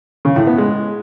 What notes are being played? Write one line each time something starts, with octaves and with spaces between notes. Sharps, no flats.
C#3
A2
B3
G#3